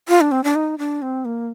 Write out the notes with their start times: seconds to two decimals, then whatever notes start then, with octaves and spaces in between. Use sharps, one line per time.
0.09 F4
0.21 D4
0.32 C4
0.44 D4
0.55 D#4
0.78 D4
1.02 C4
1.25 A#3